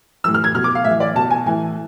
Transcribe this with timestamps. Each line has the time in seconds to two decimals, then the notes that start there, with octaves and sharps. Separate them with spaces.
0.24 A2 E3 E6
0.34 F6
0.44 G#6
0.55 B2 F6
0.64 D6
0.75 F5
0.84 A2 E3 E5
1.00 D5
1.15 B2 A5
1.31 G#5
1.46 A2 E3 G#5